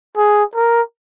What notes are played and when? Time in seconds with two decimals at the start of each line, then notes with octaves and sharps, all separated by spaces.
0.17 G#4
0.55 A#4